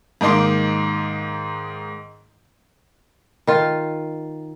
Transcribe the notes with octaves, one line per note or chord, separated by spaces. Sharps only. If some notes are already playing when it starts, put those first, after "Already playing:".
G#2 D#3 A#3 D#4 C6 D6
D#3 F4